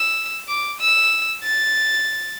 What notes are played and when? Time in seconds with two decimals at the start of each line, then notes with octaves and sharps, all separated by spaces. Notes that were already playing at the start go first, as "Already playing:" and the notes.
Already playing: E6
0.48 D6
0.80 E6
1.44 A6